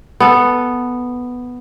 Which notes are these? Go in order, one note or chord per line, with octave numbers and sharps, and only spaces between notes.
B3 A4